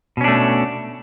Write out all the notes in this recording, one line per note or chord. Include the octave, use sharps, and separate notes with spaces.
B2 A3 C#4 D4